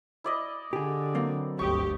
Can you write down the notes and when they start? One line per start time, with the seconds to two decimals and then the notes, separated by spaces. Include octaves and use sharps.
0.24 E4 D5 D#5
0.73 D3 G4 G#4
1.15 F#3 A#3 C4
1.59 G1 D2 G4 C#6 D#6